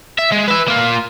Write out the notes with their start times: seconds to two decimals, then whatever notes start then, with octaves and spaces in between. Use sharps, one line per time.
0.19 E5
0.32 G#3
0.48 B4 E5
0.68 A#3 F4